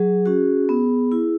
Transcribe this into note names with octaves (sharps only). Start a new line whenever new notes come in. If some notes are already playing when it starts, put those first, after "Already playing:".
Already playing: F#3 G#4
C#4 F#4
B3
E4